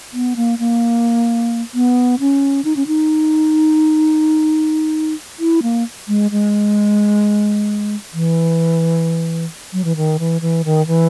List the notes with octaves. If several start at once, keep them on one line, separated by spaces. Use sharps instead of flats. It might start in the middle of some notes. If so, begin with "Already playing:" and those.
B3
A#3
A#3
B3
C#4
D#4
C#4
D#4
E4
A#3
G#3
G#3
E3
F#3
E3
D#3
E3
E3
D#3
E3